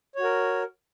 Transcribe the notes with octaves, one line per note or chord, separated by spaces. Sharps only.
F#4 A#4 C#5